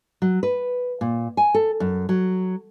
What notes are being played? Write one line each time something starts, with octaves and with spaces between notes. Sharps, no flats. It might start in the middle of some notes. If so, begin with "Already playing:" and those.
F#3
B4
A#2
G#5
A4
F#2
F#3